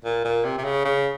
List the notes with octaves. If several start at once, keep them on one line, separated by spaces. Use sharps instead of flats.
A#2
A#2
C3
C3
C#3
C#3